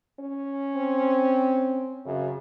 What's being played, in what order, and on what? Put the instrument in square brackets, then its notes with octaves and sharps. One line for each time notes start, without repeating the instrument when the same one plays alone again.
[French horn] C#4
[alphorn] C4
[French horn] F#2 [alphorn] C#3